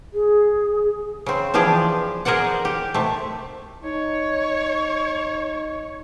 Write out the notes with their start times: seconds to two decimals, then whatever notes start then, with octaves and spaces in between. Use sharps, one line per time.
0.14 G#4
1.26 C#3 C4
1.54 E3 F3 D4 G4 G#4
2.25 G#4 A#4 C5 D5 F#5
2.65 G4
2.94 C3 A3
3.84 D#4 C#5